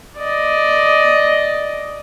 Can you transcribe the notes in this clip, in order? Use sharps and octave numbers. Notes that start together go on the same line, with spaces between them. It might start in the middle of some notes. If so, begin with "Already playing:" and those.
D5 D#5